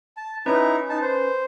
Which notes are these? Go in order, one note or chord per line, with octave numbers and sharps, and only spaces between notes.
A5
C#4 D#4 E4 B4 C#5 A#5
D#4 A5
C5